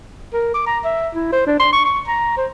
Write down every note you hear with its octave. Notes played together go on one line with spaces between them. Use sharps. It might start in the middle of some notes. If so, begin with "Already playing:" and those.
A#4
D6
A#5
E5
E4
C5
D4
C6
C#6
C#6
A#5
C5